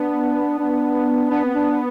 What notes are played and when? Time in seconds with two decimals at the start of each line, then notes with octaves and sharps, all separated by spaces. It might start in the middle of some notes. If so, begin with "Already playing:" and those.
Already playing: B3 D4
0.59 D4
1.31 B3 D4
1.45 C4
1.55 D4